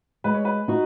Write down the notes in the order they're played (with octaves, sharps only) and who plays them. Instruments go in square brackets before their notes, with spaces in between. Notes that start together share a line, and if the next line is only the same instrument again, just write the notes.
[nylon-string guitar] G#3 [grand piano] B4
[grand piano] C#5
B4
[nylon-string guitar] D#4 F#4